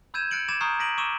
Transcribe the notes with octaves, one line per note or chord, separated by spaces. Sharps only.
B5 E6 G6 G#6 D#7 E7
F#6 A6 C#7 D7 F#7
B5 D6 G#6 A6 D#7 E7
A#5 C#6 D#6 F6 G6 C7
A#5 A#6 B6 D7 D#7 F#7
C#6 D6 E6 D#7 E7